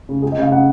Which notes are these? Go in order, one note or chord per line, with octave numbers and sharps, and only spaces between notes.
C#3
C#2 G#4
D#5
C#3 F5
C#3 F#5